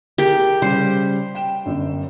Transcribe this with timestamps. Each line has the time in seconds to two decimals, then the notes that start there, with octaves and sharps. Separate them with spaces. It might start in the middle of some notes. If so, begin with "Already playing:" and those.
0.18 G4 G#4 A#4
0.62 C#3 G3 C5
1.35 G5 E7
1.65 G1 F#2